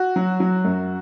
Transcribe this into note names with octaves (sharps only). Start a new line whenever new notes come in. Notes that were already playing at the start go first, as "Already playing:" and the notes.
Already playing: F#4
F#3
F#3
F#2